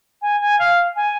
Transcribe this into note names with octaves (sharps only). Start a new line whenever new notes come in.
G#5
G#5
F5
G#5